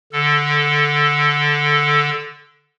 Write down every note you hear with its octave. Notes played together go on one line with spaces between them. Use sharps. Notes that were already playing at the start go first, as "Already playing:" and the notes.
D3 A4